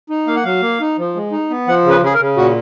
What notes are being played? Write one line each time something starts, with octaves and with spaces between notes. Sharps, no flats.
D#4
A#3 F5
F#5
F#3 F5
A#3
D#4
F3
G#3
D#4
B3
F3 F#5
C#3
B4
C#3 G#4
A#4
C#3
A#2 F#4